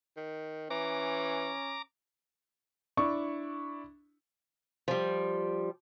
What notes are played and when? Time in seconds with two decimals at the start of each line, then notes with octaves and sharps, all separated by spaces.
0.16 D#3
0.70 E3 C#4 A#5 D6
2.97 D4 E4 C#6
4.88 F3 G3